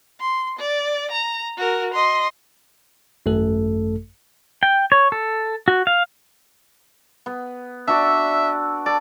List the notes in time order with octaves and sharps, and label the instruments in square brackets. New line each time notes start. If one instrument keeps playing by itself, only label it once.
[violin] C6
D5
A#5
F#4 A#4
D#5 C6
[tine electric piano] G#1 F#2 A3 A4
[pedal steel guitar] G5
C#5
A4
F#4
F5
[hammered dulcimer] B3
[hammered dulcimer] D4 F#4 D5 [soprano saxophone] E5 [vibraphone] E6
[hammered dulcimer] A4 [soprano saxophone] D5